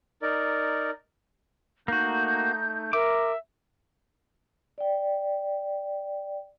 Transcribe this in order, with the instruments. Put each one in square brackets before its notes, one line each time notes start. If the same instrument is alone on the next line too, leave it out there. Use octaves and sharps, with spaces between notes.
[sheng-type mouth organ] D#4 A#4 D5
[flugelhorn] A3 [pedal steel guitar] A#3 F#4 [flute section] D#4 G6
[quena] A#4 [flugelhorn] E5 [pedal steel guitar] D6
[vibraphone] D5 G5